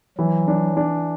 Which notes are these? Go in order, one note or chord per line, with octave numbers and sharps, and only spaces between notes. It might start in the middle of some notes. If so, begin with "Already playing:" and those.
E3 F#3
D4
D4